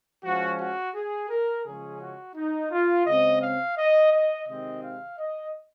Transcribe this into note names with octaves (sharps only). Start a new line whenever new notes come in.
F3 G#3 C#4 F#4
F#4
G#4
A#4
C#3 F3 G#3 C#4 G#4
F#4
D#4
F4
C#3 G#3 C4 D#5
F5
D#5
D#5
C3 D#3 G#3 C4 D#5
F5
D#5